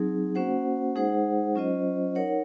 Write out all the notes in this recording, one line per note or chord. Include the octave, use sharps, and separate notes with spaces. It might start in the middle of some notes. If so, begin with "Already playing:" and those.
Already playing: F#3 C4 D#4 G#4
A#3 C#4 F#4 C5 F#5
G#3 D#4 G#4 C5 F#5
F#3 C#4 F4 C5 D#5
D#4 A#4 C#5 F#5